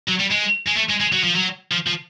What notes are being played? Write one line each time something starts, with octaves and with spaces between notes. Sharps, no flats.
F#3
G3
G#3
G#3
A3
G#3
G#3
F#3
F3
F#3
F3
F3